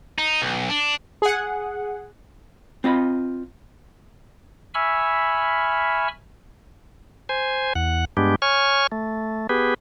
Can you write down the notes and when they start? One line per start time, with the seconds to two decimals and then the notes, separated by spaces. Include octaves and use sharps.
0.18 D#4
0.42 B1
0.69 D4
1.22 G#4 F#5
2.84 C4 F4 D#5 B5
4.74 E5 G#5 B5 C#6 E6 F6
7.29 C5 G#5
7.75 E2 F#5
8.17 G2 G#3 B3 D4 G4
8.42 C#5 G#5 C#6 F6
8.92 A3
9.49 B3 G4 G#4 B4